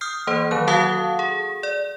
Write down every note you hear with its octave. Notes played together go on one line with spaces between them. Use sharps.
D#6 F6 G6 C7
E3 A#3 C5
D#3 F#3 F#6
F#4 A4 F5 F#5 A5 D#6
G#4
D5